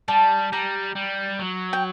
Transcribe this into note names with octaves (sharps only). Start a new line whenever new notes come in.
G3 A5
G3 A#5
G3
F#3
G5